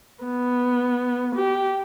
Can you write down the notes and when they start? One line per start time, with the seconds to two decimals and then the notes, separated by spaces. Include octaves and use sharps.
0.24 B3
1.35 G4